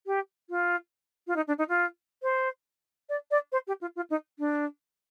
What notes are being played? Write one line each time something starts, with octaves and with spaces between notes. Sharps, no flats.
G4
F4
F4
D#4
D4
D#4
F4
C5
D5
D5
C5
G4
F4
F4
D#4
D4